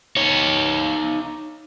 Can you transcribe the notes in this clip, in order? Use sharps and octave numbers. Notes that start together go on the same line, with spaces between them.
D#4 C#5